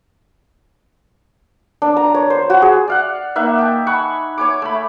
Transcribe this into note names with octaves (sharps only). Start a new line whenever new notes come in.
D4
A#5
C#5
C5
F#4
G#4
D5 F5 F#5
A#3 D#4 E5 F#5
G5 A5
F#5 G#5 B5 C#6
C#5 G#5 D6
A3 B5